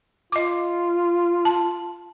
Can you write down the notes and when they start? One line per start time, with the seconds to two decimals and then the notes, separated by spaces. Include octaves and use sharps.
0.32 F4 D#5 D6
1.45 A5